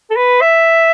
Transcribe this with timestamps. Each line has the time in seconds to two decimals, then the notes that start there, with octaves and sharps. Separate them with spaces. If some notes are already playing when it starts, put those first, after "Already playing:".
0.10 A4
0.17 B4
0.41 E5